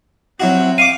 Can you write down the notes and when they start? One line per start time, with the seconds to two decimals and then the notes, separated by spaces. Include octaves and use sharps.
0.40 F#3 C4 E4 F#4
0.78 F5 C#6 D6 D#7